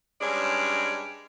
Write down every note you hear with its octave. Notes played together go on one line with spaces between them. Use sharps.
G2 G#3 C#4 C#5 D5